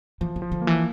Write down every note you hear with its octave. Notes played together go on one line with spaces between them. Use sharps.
E3 F3
D3
F3
D3
A#3
E3